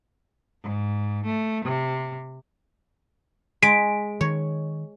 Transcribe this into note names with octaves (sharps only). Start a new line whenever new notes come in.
G#2
A3
C3
G#3 B6 D7
D#3 C#5